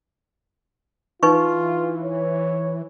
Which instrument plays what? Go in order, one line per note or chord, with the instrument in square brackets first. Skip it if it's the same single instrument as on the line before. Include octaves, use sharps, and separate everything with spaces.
[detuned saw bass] E3 [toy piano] D#4 B4 C#6 [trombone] F4
[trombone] C#5